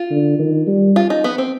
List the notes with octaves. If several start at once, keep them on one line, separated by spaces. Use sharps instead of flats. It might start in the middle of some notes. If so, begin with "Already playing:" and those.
Already playing: F4
D3
D#3
G3
F4
D#4
B3
C4